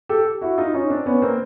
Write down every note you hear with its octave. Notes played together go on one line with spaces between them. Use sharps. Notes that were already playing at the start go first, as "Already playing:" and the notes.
G4 A4
E4 F#4
D#4 F4
C#4 D#4
C4 D4
B3 C#4
A#3 C4